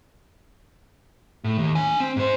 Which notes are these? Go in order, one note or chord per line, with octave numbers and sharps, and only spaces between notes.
A2
D#2
D4 G#5
C4
G#2 C5